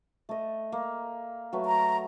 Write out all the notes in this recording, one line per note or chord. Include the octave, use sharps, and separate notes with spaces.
A3 D#5
A#3
F#3 A3 B4
A#5